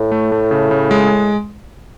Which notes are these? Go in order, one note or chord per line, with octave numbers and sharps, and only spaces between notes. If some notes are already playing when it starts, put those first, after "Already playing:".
Already playing: A2
A3
A3
C#3
C#3
G#3